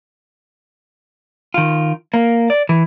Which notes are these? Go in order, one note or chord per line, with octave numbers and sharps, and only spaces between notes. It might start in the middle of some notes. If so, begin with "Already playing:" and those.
D#3 F4
A#3
D5
E3